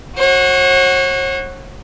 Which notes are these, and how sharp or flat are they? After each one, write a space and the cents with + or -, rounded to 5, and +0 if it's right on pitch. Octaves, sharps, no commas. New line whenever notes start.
F#4 +0 C#5 -45